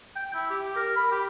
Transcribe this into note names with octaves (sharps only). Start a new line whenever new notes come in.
G5
E4
G4
A#4
B5
G4